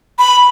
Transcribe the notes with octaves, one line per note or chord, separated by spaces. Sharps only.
B5